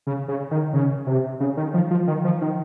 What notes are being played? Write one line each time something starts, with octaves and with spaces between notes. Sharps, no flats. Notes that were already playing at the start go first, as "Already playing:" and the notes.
C#3
C#3
D#3
C#3
C3
C#3
D#3
F3
F3
D#3
F3
D#3